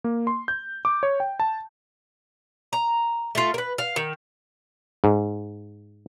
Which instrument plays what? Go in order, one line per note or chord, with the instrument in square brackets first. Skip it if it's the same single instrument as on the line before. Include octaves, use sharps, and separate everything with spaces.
[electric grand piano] A#3
C6
G6
D6
C#5
G5
A5
[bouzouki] A#5
A3 F4
A#4 B4
F5
D#3
[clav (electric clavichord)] G#2